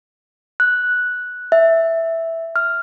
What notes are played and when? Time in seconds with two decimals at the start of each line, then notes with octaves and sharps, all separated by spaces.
0.60 F#6
1.52 E5
2.56 F6